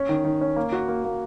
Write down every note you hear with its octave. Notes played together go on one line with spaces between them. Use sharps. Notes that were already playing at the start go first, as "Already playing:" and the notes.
Already playing: C#4
D#3
D#3
C#4
A#3
F#4
A#3
A#3